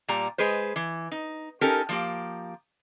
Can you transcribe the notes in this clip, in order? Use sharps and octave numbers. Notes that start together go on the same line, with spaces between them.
A#2 G3 A#5
G#3 G#4 B4 C5
E3
D#4
C#4 D#4 G4 A4 A#4
F3 A#3 G4